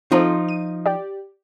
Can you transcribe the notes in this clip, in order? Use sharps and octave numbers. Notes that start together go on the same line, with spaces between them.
F3 C4 D#4 F4 A4 C5
D#7
G4 D5